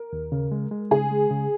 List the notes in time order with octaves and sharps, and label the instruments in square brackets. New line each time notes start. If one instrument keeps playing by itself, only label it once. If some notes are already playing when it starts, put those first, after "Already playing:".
Already playing: [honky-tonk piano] A#4
[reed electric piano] D#2
C#3
G#3
G#3
[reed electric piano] C#3 [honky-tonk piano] G#4
[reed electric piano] G#3
C#3